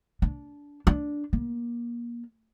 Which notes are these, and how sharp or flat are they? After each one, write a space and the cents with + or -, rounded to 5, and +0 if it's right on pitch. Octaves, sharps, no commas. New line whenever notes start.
D4 -20
D4 -5
A#3 +30